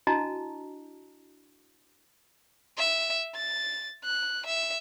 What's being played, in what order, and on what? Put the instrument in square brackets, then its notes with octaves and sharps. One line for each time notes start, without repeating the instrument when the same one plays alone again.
[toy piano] D4 E4 F#4 D#5 A5 A#5
[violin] E5
A6
F#6
E5